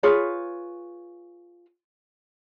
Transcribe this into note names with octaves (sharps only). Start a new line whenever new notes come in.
F4 G#4 B4 C#5